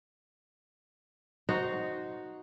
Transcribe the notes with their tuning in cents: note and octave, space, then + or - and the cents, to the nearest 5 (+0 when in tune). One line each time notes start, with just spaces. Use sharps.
D#4 +0 F#4 +0 C5 +0